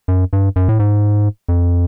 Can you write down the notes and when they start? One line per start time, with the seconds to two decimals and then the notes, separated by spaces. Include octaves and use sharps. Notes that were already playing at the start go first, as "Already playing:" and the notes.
0.08 F#2
0.33 G2
0.56 F#2
0.69 A2
0.79 G#2
1.49 F2